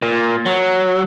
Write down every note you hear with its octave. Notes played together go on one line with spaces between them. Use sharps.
A#2
F#3